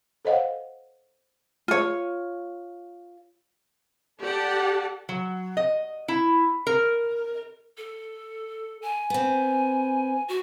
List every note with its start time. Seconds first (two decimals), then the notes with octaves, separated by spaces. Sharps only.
0.25 A4 C5 C#5 D#5 F5 F#5
1.68 F4 C#5
4.20 G4 A4 D5 F#5 A5
5.09 F#3
5.57 D#5
6.08 E4
6.67 A#4
7.77 A4
8.82 G#5
9.10 B3 C4
10.29 F#4